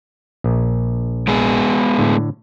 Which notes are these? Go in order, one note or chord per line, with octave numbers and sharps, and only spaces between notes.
A#1
G#3 B3 G#4
A2 D3